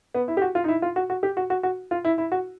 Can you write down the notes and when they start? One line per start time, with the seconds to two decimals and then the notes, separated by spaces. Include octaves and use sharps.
0.14 B3
0.28 E4
0.37 G4
0.42 F#4
0.55 F4
0.64 D#4
0.68 E4
0.82 F4
0.96 F#4
1.10 F#4
1.23 G4
1.37 F#4
1.50 F#4
1.63 F#4
1.91 F4
2.05 E4
2.18 E4
2.32 F#4